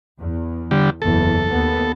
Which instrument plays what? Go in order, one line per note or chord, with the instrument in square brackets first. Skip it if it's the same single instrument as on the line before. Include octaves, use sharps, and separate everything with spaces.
[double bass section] E2
[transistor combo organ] D3 G3
[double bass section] F#1 E2 [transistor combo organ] A4
[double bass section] D#2 B3